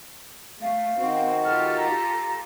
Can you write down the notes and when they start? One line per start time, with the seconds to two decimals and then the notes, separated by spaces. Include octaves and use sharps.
0.62 A3 F5
0.99 D#3 C4 F#4
1.45 F4 G4 A4 F6
1.77 A#5